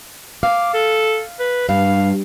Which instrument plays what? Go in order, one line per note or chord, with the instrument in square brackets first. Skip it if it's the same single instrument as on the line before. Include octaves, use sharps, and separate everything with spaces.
[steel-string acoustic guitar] F5 [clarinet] D6
[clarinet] A4
B4
[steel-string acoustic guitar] G2 [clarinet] F5